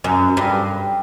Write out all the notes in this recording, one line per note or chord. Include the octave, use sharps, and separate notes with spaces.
F#2
G2